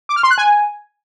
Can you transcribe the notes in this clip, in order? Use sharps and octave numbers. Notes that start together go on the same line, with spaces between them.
D6
F6
C6
F#6
G#5